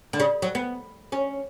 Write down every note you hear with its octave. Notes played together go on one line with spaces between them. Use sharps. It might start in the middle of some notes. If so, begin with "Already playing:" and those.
D3
C#3
F#3
B3
C#4